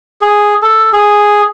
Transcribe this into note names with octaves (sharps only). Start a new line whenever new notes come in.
G#4
A4
G#4